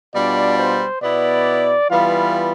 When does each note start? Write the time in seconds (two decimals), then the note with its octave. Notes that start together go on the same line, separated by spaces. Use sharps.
0.12 B2 G3 D4 F4 D5
0.57 C5
1.01 B2 B3 E4 D5
1.90 E3 G3 B3 F4 F5